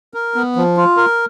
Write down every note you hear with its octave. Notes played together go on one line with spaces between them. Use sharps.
A#4
B3
F3
F4
A#4